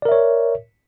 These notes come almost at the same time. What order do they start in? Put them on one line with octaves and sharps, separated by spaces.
D5 A#4 E5 C#5